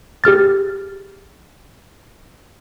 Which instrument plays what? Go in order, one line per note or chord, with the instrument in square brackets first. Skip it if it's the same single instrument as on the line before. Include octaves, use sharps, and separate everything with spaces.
[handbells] G4 G#4 F6 A6